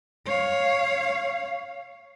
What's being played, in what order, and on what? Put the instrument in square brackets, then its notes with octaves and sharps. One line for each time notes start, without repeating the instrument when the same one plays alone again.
[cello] C#5 F5